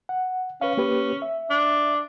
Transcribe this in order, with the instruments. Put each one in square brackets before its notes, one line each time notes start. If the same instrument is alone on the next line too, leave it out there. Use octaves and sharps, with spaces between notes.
[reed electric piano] F#5
[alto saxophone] C#4 [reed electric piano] B4 F5
[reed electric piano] A#3 G4 B4
E5
[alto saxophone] D4